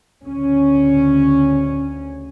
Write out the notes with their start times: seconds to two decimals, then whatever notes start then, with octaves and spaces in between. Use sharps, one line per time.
0.23 D2 C#3 C#4